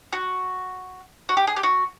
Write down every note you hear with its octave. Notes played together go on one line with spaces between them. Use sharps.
F#4
F#4
G4
G#4
G4
F#4